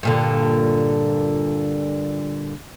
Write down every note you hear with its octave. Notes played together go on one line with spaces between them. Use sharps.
G2 A#2 D3